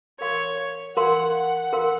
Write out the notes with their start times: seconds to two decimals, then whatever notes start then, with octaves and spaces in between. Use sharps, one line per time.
0.20 A#4 C#5 F5 C6
0.97 A#4 F5 F#5 C6
1.35 F#5
1.73 A#4 F5 C6